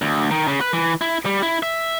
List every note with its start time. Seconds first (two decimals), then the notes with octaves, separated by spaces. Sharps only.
0.02 D2
0.31 D#3
0.48 C#3
0.61 B4
0.73 E3
1.01 E4
1.26 G3
1.42 E4
1.63 E5